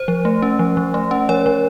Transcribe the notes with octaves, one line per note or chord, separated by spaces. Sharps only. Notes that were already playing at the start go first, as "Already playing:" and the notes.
Already playing: C5
F3
A3
C#4
F3
F3
A3
C#4
F3 C#5
F3